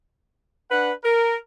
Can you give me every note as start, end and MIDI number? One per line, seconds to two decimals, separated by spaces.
0.71 0.91 62
0.71 0.91 71
0.71 0.91 78
1.04 1.37 70